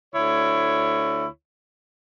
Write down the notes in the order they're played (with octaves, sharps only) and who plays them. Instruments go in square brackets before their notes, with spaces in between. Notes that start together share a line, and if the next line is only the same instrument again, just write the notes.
[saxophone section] D2 E4 C#5